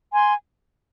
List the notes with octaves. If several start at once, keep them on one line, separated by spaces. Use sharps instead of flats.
G#5 C6